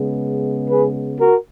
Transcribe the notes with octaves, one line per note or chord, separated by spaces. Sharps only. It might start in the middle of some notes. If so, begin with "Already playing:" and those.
Already playing: C#3 G#3 B3
G#4 B4
F#4 A#4